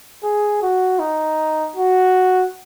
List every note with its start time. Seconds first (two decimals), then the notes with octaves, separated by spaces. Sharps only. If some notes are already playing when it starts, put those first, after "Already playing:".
0.23 G#4
0.62 F#4
0.99 D#4
1.76 F#4